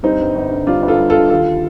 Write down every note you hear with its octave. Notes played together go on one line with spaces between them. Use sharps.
G2 C4 D#4
G1
G1
D3
G2 D4 F4
G1
F4 A4
G1
D3 F4 A4
D#2 F4 A4